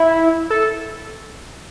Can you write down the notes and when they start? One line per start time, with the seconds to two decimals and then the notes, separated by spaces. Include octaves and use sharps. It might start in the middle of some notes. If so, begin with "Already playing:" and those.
Already playing: E4
0.50 A4